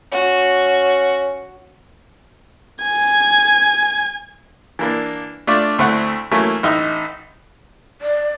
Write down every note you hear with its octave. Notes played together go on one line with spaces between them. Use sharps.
C#4 F#4
G#5
E3 A#3 D4
A3 D4 F4 D5
D2 A3 C4 E4 F#5
E3 F#3 A3 A#3 C#4
A1 D#4 D#5 E5
D5